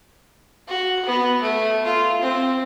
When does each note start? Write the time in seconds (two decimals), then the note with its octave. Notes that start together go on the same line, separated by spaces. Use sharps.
0.68 F#4
1.06 B3
1.42 A3
1.86 F4
2.21 C4